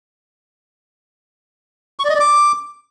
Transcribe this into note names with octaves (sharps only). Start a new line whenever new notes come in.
C#6
D5
D#5
D5
D6